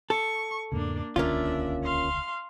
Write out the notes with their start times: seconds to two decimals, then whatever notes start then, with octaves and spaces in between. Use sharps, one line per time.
0.10 A4 C#6
0.72 E2 G#2 C#3 A#3 D4
1.16 D#1 C#2 D3 A#3 C#4 D4 F4 E5
1.84 F5 C6